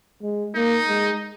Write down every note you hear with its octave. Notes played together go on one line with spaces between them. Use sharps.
G#3
A#3 D#4
G#3